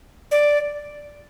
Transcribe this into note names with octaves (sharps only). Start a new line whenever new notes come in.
D5